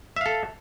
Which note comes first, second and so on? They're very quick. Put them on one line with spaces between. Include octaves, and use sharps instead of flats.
E5 F5 A4